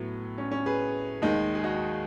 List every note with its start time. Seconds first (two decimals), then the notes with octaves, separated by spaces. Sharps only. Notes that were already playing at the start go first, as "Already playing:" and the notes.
Already playing: A2 F#3 B3
0.38 C#4
0.51 C#4
0.66 G#4 B4
1.22 D#2 D#3 G#3
1.55 G#4
1.64 D#4 F#4